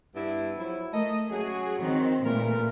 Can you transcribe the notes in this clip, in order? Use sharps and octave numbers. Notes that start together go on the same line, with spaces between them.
G2 B3 E4
F3 F#3 E4
A3 A4 A#4 D#5
F#3 C#4 F#4 G#4
D#3 C4
A#2 C#3 E3 A3 A#4